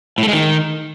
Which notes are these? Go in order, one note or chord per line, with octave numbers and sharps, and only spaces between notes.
A2
A3
G#3
D#3